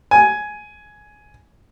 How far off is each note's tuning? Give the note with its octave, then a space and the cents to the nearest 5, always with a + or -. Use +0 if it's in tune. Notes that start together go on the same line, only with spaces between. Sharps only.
G#5 +10